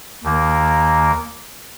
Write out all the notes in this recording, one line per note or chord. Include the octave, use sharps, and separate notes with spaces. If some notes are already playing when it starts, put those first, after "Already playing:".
D#2 D#3 A#3